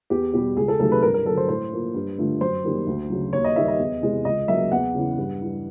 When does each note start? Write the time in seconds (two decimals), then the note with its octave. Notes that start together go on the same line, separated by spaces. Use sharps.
0.10 E2 G4
0.34 B2 G3 G4
0.57 C#2 G#4
0.68 A4
0.80 C3 D#3 F#3 A3 A4
0.92 B4
1.03 G2 A#4
1.14 A#4
1.26 D3 F#3 A4
1.37 C5
1.49 A2 C5
1.72 F3 A#3
1.94 G2
2.18 D3 F3 A3
2.41 F#2 C5
2.64 D#3 G3 A#3
2.87 D2
3.10 C#3 F#3
3.33 D#2 C#5
3.44 D#5
3.56 D#3 G3 A#3 E5
3.68 D#5
3.79 E2
4.02 C3 E3 G#3
4.25 C#2 D#5
4.48 C#3 F#3 A#3 E5
4.71 E2 F#5
4.94 C#3 E3
5.17 G2
5.41 E3 G3